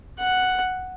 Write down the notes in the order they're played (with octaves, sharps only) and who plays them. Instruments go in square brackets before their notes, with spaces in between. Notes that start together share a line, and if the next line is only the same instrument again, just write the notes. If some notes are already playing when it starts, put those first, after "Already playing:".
[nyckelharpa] F#5